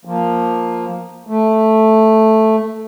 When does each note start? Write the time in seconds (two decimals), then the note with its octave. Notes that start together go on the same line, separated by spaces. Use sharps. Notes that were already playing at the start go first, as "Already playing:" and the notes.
0.05 F3 A#3
1.27 A3